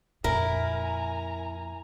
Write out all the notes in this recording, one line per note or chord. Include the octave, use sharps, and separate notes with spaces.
F2 A#2 E4 A#4 G#5 A#5